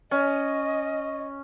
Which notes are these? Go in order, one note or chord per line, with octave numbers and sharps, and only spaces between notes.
C#4 D#5